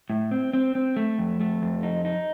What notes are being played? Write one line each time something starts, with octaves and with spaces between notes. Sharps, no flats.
A2
C4
C4
C4
A3
F2
A3
F2
D#4
D#4